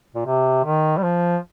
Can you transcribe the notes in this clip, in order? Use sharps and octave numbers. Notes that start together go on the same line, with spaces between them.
A#2
C3
D#3
G3
F3